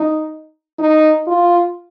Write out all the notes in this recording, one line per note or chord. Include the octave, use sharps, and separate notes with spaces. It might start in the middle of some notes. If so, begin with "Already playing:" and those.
Already playing: D#4
D#4
F4